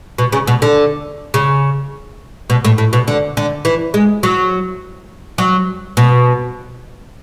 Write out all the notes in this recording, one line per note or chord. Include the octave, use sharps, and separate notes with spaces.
B2
C#3
B2
D3
C#3
B2
A2
A2
B2
D3
D3
E3
G#3
F#3
F#3
B2